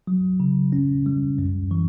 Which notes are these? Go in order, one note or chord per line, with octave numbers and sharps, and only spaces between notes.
F#3
C#3
C#4
G3
F#2
E3